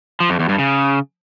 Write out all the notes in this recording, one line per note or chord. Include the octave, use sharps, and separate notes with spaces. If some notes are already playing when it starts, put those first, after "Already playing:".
F3
F2
E2
G2
C#3